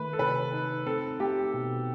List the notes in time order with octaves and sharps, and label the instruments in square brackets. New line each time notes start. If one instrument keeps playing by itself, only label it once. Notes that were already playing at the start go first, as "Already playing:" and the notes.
Already playing: [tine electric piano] D#3 A3 [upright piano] B4
[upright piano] A4
[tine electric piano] C3 [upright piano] B4
[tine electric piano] D#4
[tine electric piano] C4 [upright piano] A4
[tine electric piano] A3 [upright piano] G4
[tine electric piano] B2